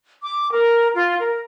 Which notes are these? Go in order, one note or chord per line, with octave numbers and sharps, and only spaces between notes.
D6
A#4
F4
A#4